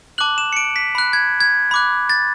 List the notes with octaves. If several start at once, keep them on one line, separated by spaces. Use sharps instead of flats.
A5 D6 F#6 F#7
E7
C#7
D7
B6
B5 F#6
G#6
G#6
B5 D6 F#6
A6